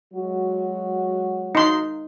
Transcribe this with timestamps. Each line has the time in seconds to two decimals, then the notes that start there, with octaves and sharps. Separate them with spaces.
0.13 F#3 G#3 F#4
1.55 D#4 C6